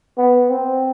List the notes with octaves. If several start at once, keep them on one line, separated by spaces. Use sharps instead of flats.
B3
C4